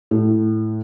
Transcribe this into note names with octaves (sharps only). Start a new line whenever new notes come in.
A2